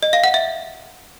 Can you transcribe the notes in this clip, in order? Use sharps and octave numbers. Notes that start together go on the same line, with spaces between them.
D#5
F5
F#5
E5